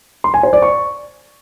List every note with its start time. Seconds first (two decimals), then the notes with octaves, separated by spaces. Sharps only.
0.24 C6
0.34 G#5
0.43 C5
0.53 D5
0.62 C#6